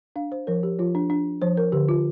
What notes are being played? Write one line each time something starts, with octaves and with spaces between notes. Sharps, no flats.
D4 F5
C5
F3 A#4
G4
F3 F4
D4
D4
F3 C5
A#4
D3 G4
F4